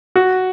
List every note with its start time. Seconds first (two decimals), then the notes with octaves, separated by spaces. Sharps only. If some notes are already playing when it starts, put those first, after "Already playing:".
0.16 F#4